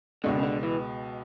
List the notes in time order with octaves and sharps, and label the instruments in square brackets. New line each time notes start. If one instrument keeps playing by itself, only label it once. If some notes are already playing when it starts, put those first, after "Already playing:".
[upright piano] C#2 B2 G#3 [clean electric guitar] D3
[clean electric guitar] C#3
D3
E3